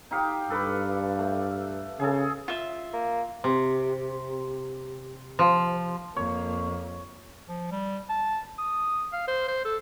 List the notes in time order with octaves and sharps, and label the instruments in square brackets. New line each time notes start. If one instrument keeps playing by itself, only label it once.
[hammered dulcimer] D#4 G4 F5
[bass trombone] G2 [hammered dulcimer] A4 B4 D6
[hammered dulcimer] A3
[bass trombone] C#3 [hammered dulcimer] G#4 A4
[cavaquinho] F4 E5
[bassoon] A#3
[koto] C3
F3
[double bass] F2 [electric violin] A#3 [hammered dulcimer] C#5
[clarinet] F3
G3
A5
D#6
F5
C5
C5
A4